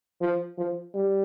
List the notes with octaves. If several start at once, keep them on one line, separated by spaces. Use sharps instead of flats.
F3
F3
G3